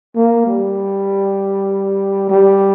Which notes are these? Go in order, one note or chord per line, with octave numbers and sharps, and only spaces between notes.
A#3
G3
G3